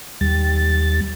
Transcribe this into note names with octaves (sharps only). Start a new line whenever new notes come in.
D#2 G3 A6